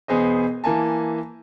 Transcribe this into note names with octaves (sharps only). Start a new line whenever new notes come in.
E1 B3 G#4 C5 D#5
E3 A#3 G#5 A5